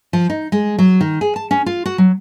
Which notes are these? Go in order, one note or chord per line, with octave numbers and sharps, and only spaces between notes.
F3
D#4
G#3
F#3
D#3
G#4
A5
C#4
F4
F#4
F#3